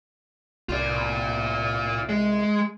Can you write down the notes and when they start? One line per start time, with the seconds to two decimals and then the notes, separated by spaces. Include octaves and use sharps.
0.69 C2 F4 D5
2.09 G#3